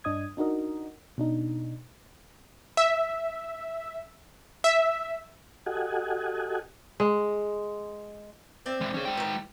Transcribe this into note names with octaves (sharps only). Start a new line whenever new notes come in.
G2 D4 D#5 D#6 G#6
D4 D#4 F#4 A#4 D#5
B2 D4 D#4
E5
E5
F#4 G4 A4 D#5 F#5 G#5
G#3
C4 D5 E5
E3 G#3
C#4 G#4
G#3 G5
D#3 E3